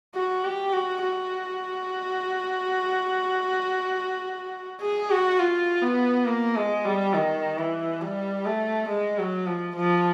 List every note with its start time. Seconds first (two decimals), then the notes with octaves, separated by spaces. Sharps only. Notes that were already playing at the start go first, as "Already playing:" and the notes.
0.15 F#4
0.44 G4
0.73 F#4
1.02 F#4
4.81 G#4
5.11 F#4
5.39 F4
5.82 B3
6.27 A#3
6.56 G#3
6.85 G3
7.14 D#3
7.58 E3
8.01 G3
8.45 A3
8.89 G#3
9.18 F#3
9.46 F3
9.76 F3